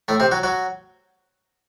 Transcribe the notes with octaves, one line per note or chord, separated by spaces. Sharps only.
A2 A3
C3 C4
F#3 F#4
F#3 F#4